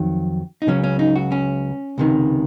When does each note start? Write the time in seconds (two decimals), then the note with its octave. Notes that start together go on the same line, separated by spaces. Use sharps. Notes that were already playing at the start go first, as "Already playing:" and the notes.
Already playing: F2 D#3 F#3
0.62 D#4
0.67 C#2 C#3 F#3 C#4
0.84 C#4
0.99 D#4
1.16 F#4
1.32 C#4
1.98 C#2 C3 D#3